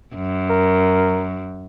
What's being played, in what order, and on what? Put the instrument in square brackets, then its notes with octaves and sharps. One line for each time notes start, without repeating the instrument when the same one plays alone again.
[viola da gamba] F#2
[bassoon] A#4